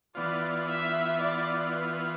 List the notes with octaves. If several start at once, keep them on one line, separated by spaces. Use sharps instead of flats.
E3 B3 F4 D5
E5
D5
B4